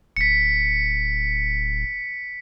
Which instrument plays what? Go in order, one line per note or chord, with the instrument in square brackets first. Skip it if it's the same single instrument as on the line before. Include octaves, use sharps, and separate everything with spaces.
[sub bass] D1 [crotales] B6 C#7